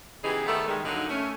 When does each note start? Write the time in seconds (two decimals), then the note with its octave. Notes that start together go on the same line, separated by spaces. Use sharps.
0.23 C#3 E3 B3 D#4 G4 G#4
0.47 D#3 G3 A3 B3 A4
0.67 D#3 G3 G#3
0.85 G2 D3 F#3 A#3 D#4
1.10 A3 C#4